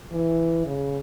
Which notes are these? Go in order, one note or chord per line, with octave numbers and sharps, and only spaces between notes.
E3
C#3